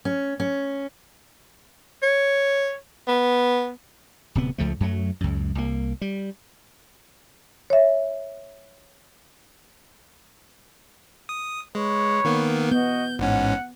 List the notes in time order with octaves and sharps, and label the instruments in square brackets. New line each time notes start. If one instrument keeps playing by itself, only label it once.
[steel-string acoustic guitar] C#4
C#4
[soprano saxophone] C#5
B3
[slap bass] D1 C3 B3
C#2 F3 A3
F#2 F#3 A3
C#2 F#2
C2 A#3
G3
[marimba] C#5 E5
[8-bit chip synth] D#6
[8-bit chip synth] G#3 [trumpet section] B4 C#5
[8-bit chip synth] D#3 A#3 B3
[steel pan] B3 [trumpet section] F#4 D#5 [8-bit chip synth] G6
[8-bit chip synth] A1 G#2 C#4 [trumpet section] F#5